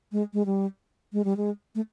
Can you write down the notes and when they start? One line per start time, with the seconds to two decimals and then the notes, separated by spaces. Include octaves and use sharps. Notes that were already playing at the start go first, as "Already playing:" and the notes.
0.12 G#3
0.33 G#3
0.46 G3
1.13 G#3
1.25 G3
1.37 G#3
1.75 A3